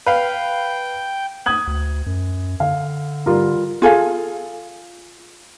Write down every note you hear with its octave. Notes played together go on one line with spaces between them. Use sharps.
B4 F5 G5
D#6 G#6 F#7
D2
F#2
D3 F5
G3 F4 A#4
F4 G#4 A4 F5